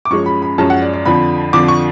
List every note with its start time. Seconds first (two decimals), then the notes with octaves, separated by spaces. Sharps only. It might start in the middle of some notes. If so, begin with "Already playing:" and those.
0.05 D6
0.10 F#2 F3 G#3 C#4 C#6
0.26 B5
0.42 B5
0.58 F#2 F3 G#3 C#4 A5
0.70 F#5
0.82 D5
0.93 D5
1.05 F2 D3 F3 B5
1.53 F2 D3 F3 D6
1.68 C#6